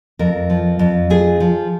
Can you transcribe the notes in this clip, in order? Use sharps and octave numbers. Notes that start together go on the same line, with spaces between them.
F2 A#4
F3
F2
F3 G#4
F3